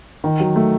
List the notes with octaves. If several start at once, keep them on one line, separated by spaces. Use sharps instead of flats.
D#3
F#3
A3